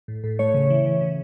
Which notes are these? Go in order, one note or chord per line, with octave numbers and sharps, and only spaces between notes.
A2
A2
A3 C#5
C#3
E3
C#3
C#3